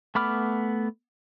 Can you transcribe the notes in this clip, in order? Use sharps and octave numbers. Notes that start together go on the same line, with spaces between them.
A3 B3 B5 D6 F6